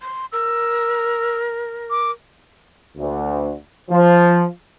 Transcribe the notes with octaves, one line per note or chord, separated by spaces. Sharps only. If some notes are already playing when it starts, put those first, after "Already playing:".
C6
A#4 E6
D6
D2
F3